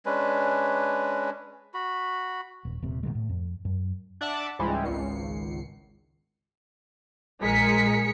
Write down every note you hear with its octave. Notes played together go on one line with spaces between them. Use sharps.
G#3 C#4 D4 B4
F#4 B5
D#1
D#1 C3
B2 D3 D#3 G#3
A2
F2
F#2
D4 D5 E5 F#5 A5
C#2 G#2 E3 G3 G#3
G#1 C#2 C7 C#7
A#1 G#3 A#4 G#5 B6 C#7